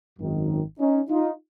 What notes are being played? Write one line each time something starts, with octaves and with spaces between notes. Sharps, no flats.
G#1 F#2 D#3
C#4 D#4
D#4 F4